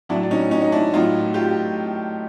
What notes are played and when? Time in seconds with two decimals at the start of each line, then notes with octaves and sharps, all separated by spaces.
0.09 A2 F#3 D4 E4
0.23 D4
0.31 C#4 D#4
0.51 C#4 D#4
0.62 D#4
0.72 D4 E4
0.93 A2 F#3 D#4 F4
1.34 F4 G4